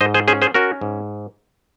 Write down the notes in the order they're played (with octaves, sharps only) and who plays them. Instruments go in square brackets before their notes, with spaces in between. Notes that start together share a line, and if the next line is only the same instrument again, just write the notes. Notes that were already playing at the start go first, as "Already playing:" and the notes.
[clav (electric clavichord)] G#2 C5 D#5
G#4 C5
C#4 G#4 C5
G#4 C5
C#4 F#4 A#4
G#2